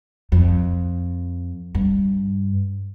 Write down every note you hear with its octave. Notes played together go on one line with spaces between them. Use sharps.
F2
G2